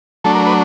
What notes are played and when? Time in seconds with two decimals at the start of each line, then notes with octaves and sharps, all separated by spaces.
0.24 F#3 A3 D4 A4
0.35 A#4
0.46 B4